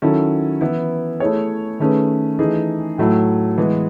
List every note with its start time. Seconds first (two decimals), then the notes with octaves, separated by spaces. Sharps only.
0.02 D#3 F#3 C#4 E4 A4
0.61 E3 B3 E4
1.20 A3 E4 G#4 C#5
1.80 D#3 A3 C#4 G#4 B4
2.39 E3 A3 D#4 G#4
2.98 A2 F#3 A3 E4
3.58 E3 G#3 B3